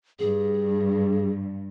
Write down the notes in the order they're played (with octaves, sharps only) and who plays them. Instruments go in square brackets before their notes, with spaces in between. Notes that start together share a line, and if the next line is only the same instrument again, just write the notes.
[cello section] G2 [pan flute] G#4